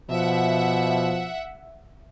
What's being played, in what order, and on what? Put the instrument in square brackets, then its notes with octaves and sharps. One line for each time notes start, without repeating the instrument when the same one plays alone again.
[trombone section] B2 F3 [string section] E5 F#5